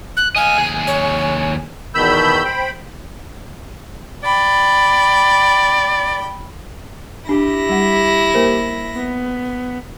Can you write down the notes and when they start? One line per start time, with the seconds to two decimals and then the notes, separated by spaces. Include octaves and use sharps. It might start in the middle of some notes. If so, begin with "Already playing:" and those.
0.17 F#6
0.36 D#5 F5 G#5
0.58 D#2 G#4
0.87 C#5
1.95 E2 B2 D#3 B5 E6 G6
2.45 C5 G5 B5
4.24 D5 G5 B5
7.29 D4 E4 G4 A#6
7.69 G3 F#5
8.34 A#3 A#4 C5
8.95 B3